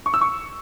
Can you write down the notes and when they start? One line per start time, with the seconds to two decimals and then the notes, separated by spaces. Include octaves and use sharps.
0.06 C#6
0.14 E6
0.21 C#6